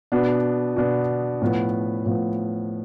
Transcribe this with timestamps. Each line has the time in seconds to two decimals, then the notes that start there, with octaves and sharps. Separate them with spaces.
0.12 B2 B3 D4
0.76 B2 B3 D4
1.42 A2 F3 B3
2.06 A2 F3 B3